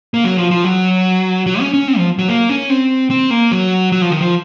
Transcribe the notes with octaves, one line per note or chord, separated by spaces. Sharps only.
A#3
F#3
F3
F3
F#3
F#3
C#4
C#4
C4
F3
F#3
A#3
C#4
C4
C4
A#3
F#3
F#3
F3
D#3
F3